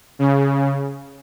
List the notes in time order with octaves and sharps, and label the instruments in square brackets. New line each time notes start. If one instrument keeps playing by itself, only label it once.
[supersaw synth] C#3